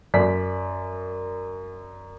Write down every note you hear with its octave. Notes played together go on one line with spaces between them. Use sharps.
F#2 D5 B6